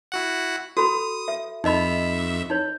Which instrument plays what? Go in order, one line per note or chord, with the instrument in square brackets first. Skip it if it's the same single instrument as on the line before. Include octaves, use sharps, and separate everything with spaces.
[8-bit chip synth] E4 F#4 F#5
[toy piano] F#4 A4 B5 [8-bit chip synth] D#6
[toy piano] E5
[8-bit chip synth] F2 E5 [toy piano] D#4 D#5 B5
[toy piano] D#4 C#5